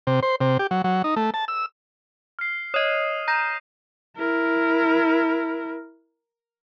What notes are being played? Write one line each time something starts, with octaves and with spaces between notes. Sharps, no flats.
C3
C5
C3
G4
F#3
F#3
D#4
A3
A5
E6
F6 C7
C#5 D#5 D#6 D#7
A#5 G6 A#6 E7
E4 A#4